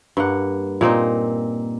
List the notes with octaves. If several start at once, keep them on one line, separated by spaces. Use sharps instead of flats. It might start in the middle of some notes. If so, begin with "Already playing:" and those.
G2 A#3 F#5
A#2 A#3 C4 D#4